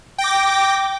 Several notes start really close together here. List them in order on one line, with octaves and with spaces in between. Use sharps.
G5 A#6 D6